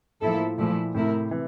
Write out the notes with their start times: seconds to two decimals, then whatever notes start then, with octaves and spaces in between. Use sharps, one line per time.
0.21 A2 F3 A#3 E4 A4
0.58 A#2 F3 A3 E4
0.94 A2 C3 A3 E4 A#4
1.31 C3 E3